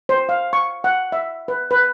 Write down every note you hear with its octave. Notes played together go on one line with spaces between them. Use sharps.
C5
F5
C#6
F#5
E5
B4
B4